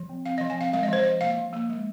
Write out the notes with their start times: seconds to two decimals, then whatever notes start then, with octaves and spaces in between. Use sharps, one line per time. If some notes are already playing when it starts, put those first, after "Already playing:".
Already playing: F3
0.09 C4
0.26 C4 F5
0.38 D#5
0.41 F3
0.50 G#5
0.58 C4 F5
0.73 G#3 F5
0.83 D#5
0.89 F3 C5
1.03 F3 D#5
1.21 A#3 F5
1.38 F3
1.53 A#3
1.69 G#3